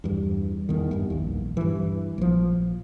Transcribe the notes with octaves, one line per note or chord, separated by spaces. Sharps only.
E2 G2
E2 D#3
E2 G2
A#1 D#2
G2 E3
A#1 F3